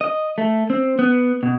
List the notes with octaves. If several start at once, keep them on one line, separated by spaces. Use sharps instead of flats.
D#5
A3
C4
B3
B2